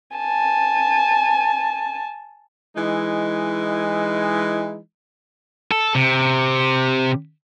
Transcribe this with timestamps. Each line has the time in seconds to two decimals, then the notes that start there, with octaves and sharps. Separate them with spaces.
0.17 G#5 A5
2.76 E3 G#3 D#4 E4
5.71 A4
5.95 C3